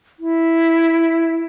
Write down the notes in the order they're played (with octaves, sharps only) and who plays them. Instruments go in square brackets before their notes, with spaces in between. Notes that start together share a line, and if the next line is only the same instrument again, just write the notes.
[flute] E4